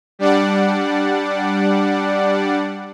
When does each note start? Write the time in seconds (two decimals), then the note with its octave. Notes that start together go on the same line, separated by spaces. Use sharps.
0.19 G3 D4 D5 F#5